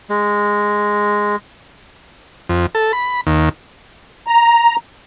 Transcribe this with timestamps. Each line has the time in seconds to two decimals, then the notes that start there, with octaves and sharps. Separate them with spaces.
0.10 G#3
2.49 F2
2.75 A4
2.93 B5
3.27 D#2
4.27 A#5